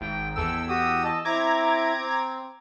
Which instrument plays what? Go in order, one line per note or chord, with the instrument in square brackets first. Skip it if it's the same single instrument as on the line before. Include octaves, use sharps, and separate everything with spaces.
[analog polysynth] G#1 [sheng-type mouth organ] G5
[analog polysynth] E2 E6 [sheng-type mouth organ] A4 G5
[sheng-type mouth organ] F#4 G4 D#6
D#5 A5
[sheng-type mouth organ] C4 E4 [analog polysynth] A#5 D6 G#6
[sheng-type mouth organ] C4